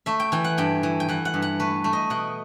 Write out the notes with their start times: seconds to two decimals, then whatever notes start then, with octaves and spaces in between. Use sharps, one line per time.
0.06 A3 E5
0.20 G5
0.32 E3 G5
0.44 F#5
0.58 G2 G5
0.83 E3
1.00 G5
1.08 E3 F#5
1.25 F#5
1.34 G2
1.42 F#5
1.60 A3 B4
1.84 A3
1.93 D#5
2.10 B2 F#5